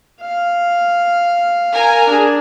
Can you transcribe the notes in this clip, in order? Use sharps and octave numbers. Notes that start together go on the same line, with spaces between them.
F5
A#4 G#5
D4 G#4